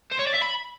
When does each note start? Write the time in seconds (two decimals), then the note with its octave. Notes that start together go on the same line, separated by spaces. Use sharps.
0.12 C5
0.19 C#5
0.27 D5
0.35 E5
0.42 B5